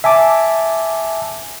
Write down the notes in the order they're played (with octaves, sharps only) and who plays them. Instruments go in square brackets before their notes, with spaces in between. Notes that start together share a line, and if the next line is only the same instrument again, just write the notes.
[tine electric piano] E5 G#5 A5 D6